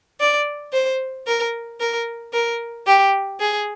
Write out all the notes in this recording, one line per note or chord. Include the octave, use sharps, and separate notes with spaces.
D5
C5
A#4
A#4
A#4
G4
G#4